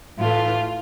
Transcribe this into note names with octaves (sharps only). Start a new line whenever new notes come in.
A2 E3 A3 F4